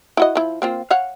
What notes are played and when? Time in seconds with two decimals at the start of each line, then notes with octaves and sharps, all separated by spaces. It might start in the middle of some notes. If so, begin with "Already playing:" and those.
0.17 E4 F#4 D#5
0.35 F3 E4
0.62 A#3 C4 F4
0.90 C#5 F5 F#5